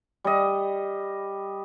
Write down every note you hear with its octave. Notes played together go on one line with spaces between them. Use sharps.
G3 D#5